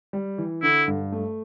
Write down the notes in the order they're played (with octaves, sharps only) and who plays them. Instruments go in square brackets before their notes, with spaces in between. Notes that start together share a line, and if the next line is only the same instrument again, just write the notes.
[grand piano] G3
E3
[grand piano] D3 [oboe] E4
[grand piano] G2
A3